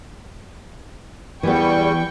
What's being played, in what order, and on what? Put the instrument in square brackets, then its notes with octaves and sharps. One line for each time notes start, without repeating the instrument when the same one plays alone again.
[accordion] E2 G3 [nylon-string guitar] E3 B3 [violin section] G5 C#6